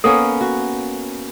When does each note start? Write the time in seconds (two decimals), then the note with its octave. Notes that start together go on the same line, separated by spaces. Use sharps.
0.04 A#3 B3 C#4 A4
0.41 F#4